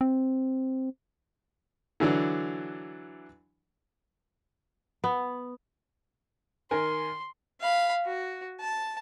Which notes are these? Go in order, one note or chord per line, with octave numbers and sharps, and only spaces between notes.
C4
D3 E3 F#3 D4
B3
D#3 A#4 G#5 C6
F5 B5
F#4
A5